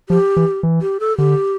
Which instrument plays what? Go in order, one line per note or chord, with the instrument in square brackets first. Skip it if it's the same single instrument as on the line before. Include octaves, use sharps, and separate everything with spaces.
[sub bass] F3 [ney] G4
[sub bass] E3
E3
[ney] G4
A4
[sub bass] D3 [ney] G4